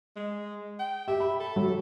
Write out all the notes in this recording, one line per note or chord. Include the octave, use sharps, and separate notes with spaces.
G#3
G5
G4 E5
B5
A4
F#3